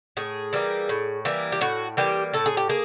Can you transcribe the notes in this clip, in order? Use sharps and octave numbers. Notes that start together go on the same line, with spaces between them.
A2 G#4
E3 G3 A#3
A2
E3 G3 A#3
G4
A2 F#4
E3 G3 A#3 G4
A2 A4
G#4
G4
A#3 G#4